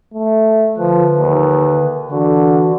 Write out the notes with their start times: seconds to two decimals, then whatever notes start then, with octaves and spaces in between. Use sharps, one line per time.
0.14 A3
0.78 D3 F3 B4
1.19 D#2
2.11 D3 E3 F#4